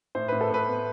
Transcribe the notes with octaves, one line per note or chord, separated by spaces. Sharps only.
A2 C5
A2 B4
A4
A2 B4
B3